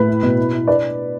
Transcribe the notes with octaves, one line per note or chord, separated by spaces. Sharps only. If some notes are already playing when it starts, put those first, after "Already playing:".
Already playing: A2 B4
E4
B2
E4
E4
D4 B4 D5